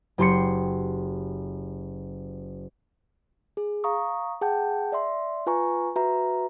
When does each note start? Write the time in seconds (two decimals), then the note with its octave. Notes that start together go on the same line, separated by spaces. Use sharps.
0.18 F#1 G4 C6 C#7
3.57 G#4
3.84 F5 A#5 C#6 D#6
4.41 G#4 F#5 G5 A5 G6
4.92 D5 E5 C6
5.46 F4 B4 G#5 A#5 C#6
5.96 F#4 B4 E5 A#5